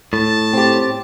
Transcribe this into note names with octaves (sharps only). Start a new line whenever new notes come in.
A2 A5
C4 G4